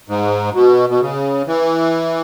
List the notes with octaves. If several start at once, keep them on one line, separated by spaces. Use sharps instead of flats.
G#2
B2
B2
C#3
E3